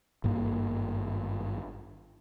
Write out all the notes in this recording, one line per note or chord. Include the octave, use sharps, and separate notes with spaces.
G#1 G2 A#3